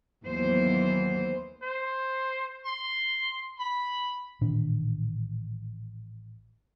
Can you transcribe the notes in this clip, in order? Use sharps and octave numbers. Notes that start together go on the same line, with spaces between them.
D#2 E3 F#3 B3 C5
C5
C6
B5
A1 A#2 D#3 D4